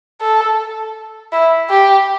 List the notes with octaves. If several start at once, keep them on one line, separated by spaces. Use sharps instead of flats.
A4
E4
G4